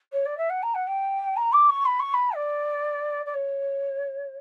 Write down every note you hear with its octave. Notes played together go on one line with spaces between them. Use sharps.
C#5
D5
E5
F#5
A#5
F#5
G5
A#5
D6
C#6
B5
C#6
B5
D5
D5
C#5